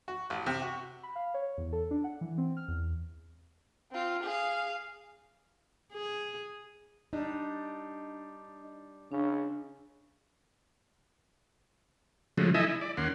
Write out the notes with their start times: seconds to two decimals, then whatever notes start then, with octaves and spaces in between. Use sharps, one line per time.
0.08 F#4
0.30 A1
0.46 C3
0.62 F#4
1.03 B5
1.16 F5
1.34 C#5
1.58 E2
1.73 A4
1.91 D4
2.04 F#5
2.21 E3
2.38 C4
2.57 F6
2.68 E2
3.92 C4 F4
4.23 G#4 F5
5.93 G#4
7.13 G3 D4 D#4
9.12 C#3 D4
12.38 C#3 F3 F#3 G#3 A3
12.54 D#4 E4 A4 D#5 E5 G#5
12.66 E4
12.81 D5
12.97 D#2 A#3 C#4 F#5 C6